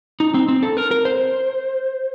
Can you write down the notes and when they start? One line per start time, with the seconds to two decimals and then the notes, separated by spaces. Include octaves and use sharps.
0.20 D#4
0.34 C4
0.48 C4
0.63 A4
0.77 A#4
0.91 A#4
1.05 C5